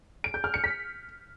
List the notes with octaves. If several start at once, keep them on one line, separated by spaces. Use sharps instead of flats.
D7
G6
F6
C#7
B6